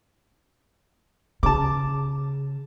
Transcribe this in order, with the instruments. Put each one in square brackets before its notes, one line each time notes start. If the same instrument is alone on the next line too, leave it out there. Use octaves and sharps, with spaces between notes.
[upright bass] C#3 [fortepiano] A5 D6